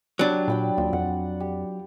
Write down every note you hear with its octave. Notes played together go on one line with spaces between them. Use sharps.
F#3 G3 D4
A#2 D5 G5 B5
D#2 F3
F2 F#5
G4